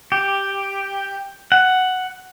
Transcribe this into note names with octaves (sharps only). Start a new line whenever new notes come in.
G4
F#5